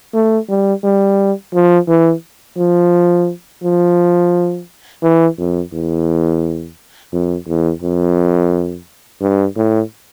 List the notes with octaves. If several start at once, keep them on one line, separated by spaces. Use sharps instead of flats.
A3
G3
G3
F3
E3
F3
F3
E3
F2
E2
F2
E2
F2
G2
A2